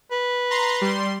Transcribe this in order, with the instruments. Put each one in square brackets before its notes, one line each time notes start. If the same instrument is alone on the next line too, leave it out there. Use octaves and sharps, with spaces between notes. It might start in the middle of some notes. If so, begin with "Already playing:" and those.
[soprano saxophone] B4
[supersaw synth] A#5 C6
G3 C6